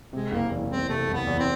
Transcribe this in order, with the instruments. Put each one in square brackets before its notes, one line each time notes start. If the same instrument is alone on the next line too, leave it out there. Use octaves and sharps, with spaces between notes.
[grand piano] C3 [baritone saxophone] G#3
[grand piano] F#1 [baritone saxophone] A#3
[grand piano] E2
[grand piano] F#1 [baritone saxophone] C4
[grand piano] C3 [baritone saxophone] A3
[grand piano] F#1
[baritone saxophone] B3
[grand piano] E2
[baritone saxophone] C4